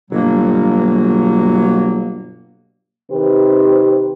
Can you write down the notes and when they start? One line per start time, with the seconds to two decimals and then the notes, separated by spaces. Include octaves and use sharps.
0.11 G1 B2 F#3 A#3
3.11 C3 D#3 G4 B4 C5